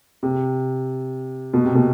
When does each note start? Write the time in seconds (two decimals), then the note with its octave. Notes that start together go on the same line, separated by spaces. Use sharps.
0.23 C3
1.54 B2
1.65 C3
1.75 B2